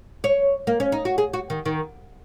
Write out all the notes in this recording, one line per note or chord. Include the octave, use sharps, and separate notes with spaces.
C#5
A#3
C#4
D#4
F#4
G#4
F#4
D#3
D#3